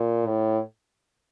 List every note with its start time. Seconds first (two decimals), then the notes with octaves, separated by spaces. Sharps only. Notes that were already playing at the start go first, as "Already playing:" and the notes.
Already playing: A#2
0.27 A2